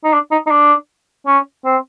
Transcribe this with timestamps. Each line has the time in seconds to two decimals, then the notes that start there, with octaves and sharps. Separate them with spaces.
0.04 D#4
0.13 D4
0.31 D#4
0.47 D#4
0.51 D4
1.27 C#4
1.65 C4